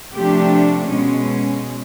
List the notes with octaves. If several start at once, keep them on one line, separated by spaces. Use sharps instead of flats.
C3 F3 A3 D4 G4
B2 G#3 C#4